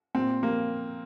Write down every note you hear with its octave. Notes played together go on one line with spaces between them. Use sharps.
A#2 C4
F3 A#3